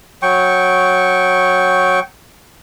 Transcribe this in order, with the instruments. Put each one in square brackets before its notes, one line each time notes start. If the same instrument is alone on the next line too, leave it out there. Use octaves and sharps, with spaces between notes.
[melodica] F#3 G5 C#6